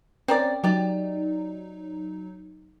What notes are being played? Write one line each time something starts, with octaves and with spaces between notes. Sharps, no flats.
C4 C#4 A#4 D5
F#3 D#4 G4 D5